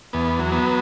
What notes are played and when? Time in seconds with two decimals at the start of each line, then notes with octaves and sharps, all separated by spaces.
0.13 E2 B3
0.39 F#3
0.52 B3